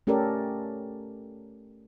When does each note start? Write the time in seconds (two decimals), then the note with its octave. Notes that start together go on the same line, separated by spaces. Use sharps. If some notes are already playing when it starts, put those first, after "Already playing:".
0.07 A3 C#4 G4 A4 A#4 D5